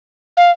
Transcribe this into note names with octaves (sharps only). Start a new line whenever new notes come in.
F5